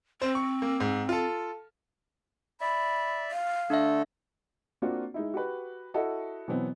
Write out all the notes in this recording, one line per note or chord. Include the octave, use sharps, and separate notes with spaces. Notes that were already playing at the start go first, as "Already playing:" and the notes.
C4 C5
C#6
A#3
G#2
F4 A4
D5 E5 B5
F5
D3 A3 D4 A4 E5
A#3 C4 D4 F4 F#4
G#3 D#4 E4
F#4 G4 B4
E4 F#4 A4 D#5 F#5
B2 E3 F#3 B3 C4